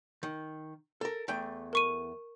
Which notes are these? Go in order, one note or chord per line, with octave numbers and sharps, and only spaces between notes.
D#3
A4 A#4
E2 A3 G5
A#4 C#6 D#7